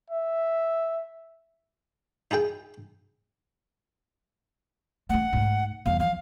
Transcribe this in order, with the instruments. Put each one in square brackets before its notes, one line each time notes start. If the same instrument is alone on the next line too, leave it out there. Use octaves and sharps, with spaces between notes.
[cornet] E5
[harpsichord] D#4 E4 G#4 G5
[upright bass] A3 A#3 [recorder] F#5
[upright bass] G#2 A3
[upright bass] E2 G3 [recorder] F5
[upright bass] F3 [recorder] F5